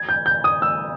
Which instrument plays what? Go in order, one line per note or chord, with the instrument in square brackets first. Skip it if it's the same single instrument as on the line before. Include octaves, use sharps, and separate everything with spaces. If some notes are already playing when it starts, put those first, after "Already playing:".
Already playing: [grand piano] G#6
G6
G6
D#6
E6